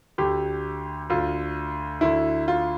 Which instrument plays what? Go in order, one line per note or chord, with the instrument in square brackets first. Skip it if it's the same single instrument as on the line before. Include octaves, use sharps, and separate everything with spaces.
[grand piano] D2 D3 G4
D2 D3 F4
D2 D3 E4
F4